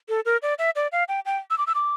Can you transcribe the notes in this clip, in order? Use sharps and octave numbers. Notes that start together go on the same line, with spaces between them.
A4
A#4
D5
E5
D5
F5
G5
G5
E6
D6
E6
D6